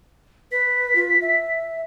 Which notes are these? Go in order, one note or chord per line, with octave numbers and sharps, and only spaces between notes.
B4 B6
F4
E5